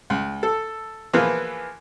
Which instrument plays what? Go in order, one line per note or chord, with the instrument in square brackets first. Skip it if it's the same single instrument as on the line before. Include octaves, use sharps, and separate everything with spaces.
[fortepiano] C#2
A4
E3 F3 A#3 B3 G#4 B4